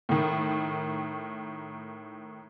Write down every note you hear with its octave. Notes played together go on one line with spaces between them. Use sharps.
A2 D#3